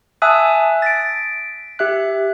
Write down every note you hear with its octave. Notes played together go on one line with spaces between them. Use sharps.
E5 G#5 A5 D#6 E6 F#6
A6 B6 D7
G4 E5 F#6